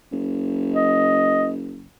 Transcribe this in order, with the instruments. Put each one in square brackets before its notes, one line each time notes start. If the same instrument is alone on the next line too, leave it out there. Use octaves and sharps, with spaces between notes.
[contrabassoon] F#1
[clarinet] D#5